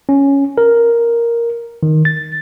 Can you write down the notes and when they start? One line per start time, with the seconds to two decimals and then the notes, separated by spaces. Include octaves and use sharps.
0.09 C#4
0.58 A#4
1.83 D#3
2.05 A6